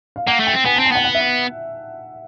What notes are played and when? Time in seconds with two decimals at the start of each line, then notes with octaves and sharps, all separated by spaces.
0.16 F5
0.27 A#3 F#5
0.40 A3
0.47 G5
0.54 C4
0.66 B3 G#5
0.76 C4 A5
0.85 G5
0.92 B3 F#5
1.04 F#5
1.15 E5